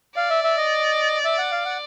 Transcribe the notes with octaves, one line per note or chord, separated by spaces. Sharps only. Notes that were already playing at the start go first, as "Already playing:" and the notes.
D5 F5
E5
E5
D#5
E5
F#5
F5
F#5